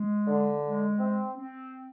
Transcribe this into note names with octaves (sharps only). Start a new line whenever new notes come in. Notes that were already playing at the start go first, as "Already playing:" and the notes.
Already playing: G#3
D3
G#3
C4
C4